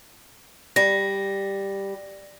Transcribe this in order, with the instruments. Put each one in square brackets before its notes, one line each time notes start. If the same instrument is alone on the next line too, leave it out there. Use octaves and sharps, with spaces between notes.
[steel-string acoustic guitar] G3 [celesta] A#6